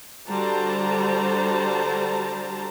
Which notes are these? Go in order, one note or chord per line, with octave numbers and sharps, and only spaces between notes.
D3 G3 F#4 C5 A5 A#5